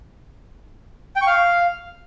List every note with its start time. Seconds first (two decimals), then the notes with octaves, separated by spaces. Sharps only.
1.16 G5
1.21 C#6
1.27 F5